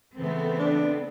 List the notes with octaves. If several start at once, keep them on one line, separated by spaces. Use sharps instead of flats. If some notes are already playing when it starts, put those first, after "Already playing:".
C#3 E3 A3 B3 C4 A4
D4